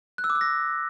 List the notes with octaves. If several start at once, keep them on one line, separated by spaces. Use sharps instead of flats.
F#6
E6
D6
E6
A#6